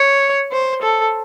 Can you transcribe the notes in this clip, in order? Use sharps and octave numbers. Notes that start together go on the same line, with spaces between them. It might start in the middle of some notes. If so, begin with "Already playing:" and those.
Already playing: C#5
C5
A4